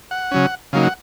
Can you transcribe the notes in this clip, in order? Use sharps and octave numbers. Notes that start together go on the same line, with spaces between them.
F#5
C#3 F#3 C#4
C#3 F#3 A#3 D#4 F5
F#5